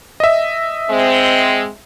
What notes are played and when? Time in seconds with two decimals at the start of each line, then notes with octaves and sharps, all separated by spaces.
0.20 D#5 E5
0.89 G#3 C4